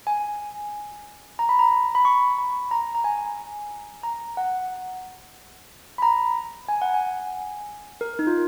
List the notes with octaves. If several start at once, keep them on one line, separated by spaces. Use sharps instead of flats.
G#5
A#5
B5
A#5
B5
C#6
B5
A#5
A#5
G#5
A#5
F#5
B5
A#5
G#5
F#5
G#5
A#4
D#4
F4